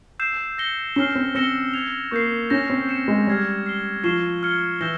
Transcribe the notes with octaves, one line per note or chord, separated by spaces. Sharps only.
E6 G6 C7 E7
E6 A#6 C#7 G7
C#4 F6 C7 G7
C4
C4 E6 A#6 C#7 E7 G7
G#6 C#7 F7
A#3 C#6 G6 C7
C#4 G6 A#6 E7
C4
G6 C#7 E7
G#3
G3 F6 G#6 C7
F6 C7 G7
F3 C#6 F6 C7 E7 G7
F6 G#6 C#7 G7
E3 E6 G6 A#6 E7 G7